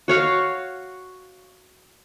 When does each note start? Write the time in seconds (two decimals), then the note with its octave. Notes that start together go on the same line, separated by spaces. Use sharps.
0.08 F#4 C#5 F5